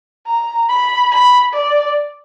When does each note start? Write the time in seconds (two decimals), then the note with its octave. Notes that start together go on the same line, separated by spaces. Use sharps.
0.26 A#5
0.69 B5
1.11 B5
1.53 D5